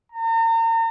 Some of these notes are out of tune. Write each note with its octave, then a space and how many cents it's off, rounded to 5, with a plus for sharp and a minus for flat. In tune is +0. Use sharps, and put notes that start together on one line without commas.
A#5 -40